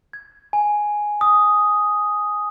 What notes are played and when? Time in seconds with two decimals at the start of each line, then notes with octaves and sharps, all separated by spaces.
0.13 G#6
0.53 G#5
1.21 D#6